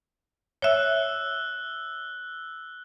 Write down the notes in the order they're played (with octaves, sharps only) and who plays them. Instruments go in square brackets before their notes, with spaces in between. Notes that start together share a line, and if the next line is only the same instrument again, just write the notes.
[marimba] C#5 E5 [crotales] E6 F#6 G7